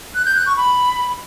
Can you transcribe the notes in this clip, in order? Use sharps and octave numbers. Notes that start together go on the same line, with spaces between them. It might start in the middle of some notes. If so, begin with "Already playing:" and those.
F#6
G6
F#6
C#6
B5